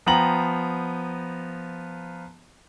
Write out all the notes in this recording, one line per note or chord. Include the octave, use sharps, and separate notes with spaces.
F3 B3 G5 A#5 F#7